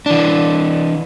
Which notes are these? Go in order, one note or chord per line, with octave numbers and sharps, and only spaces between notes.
E3 D4